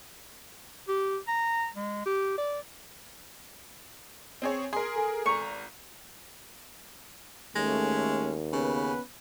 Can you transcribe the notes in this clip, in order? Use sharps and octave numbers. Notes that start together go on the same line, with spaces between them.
G4
A#5
G#3
G4
D5
C4 G#4 C#5
G#4 A#4 C6
A4 G#5
G#1 A#5 C#6
D#2 G#3 A3 C#4
C#3 B3 C#4 B4